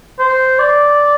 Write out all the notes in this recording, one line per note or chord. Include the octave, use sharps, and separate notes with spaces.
C5
D5